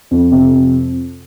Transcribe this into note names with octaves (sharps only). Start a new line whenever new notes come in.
F2
C3
F2